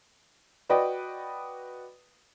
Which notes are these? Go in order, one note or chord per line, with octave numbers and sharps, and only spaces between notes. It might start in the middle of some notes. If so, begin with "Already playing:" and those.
F#4 B4 D5 D#5 G5